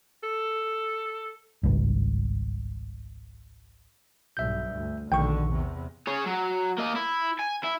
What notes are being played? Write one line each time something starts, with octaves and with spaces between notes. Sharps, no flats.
A4
G#1 C#2 G2
B1 G2 E5 G6
D2
A#1 B2 D3 D#3 G5 C#6
E2 C3
G#4 C#5
F#3
A#3 D#5
E4
G#5
E4